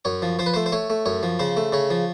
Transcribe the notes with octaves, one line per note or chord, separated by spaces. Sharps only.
F#2 C#5
F3
F3 C5
B4
A3 C5
C5
A3 C#5
A3
F#2 C#5
F3
C#3 C5
A3
C#3 C#5
F3